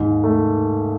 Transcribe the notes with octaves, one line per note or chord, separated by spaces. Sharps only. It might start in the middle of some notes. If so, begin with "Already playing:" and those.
Already playing: D#2 G#2
A3